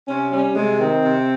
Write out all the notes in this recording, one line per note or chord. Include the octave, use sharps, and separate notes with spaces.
C3 C#4
G3 C#4
C3 G#3
D#3 C4
C3